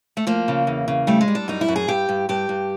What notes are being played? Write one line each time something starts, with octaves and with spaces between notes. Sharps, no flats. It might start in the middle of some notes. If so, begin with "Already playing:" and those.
A3
F3 A#3
C#3
E2
C#3
G3 A3
G#3
G3
D4
F#2 D#4
E4
F#2
G#4
G2 G4
G2
G2 G4
G2